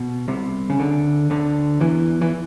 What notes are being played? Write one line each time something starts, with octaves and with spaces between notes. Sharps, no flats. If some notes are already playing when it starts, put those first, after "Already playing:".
Already playing: B2
C2 C3
C#3
D2 D3
D2 D3
E2 E3
E3